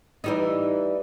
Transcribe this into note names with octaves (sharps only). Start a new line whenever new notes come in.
E3 G3 D#4